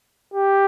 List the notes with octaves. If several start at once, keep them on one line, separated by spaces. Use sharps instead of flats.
G4